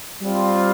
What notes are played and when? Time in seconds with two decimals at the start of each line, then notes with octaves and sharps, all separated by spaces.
0.22 G3 C4 F4